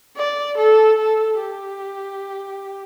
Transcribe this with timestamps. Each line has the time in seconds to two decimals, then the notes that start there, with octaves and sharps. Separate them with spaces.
0.17 D5
0.57 A4
0.99 A4
1.40 G4